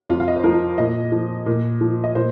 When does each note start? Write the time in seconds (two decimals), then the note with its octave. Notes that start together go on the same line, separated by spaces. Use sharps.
0.09 F2 F4
0.20 F5
0.28 D#5
0.36 C5
0.44 F3 A#4
0.78 A#2 D#5
1.12 F3
1.46 A#2
1.81 F3
2.04 D#5
2.15 A#2 C5